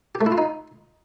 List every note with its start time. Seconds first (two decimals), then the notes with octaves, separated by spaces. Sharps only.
0.15 G4
0.21 A3
0.26 E4
0.32 F4
0.38 D#4